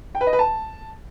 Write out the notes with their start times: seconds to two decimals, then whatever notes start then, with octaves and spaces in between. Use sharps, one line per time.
0.15 G5
0.21 B4
0.27 D#5
0.33 B4
0.39 A5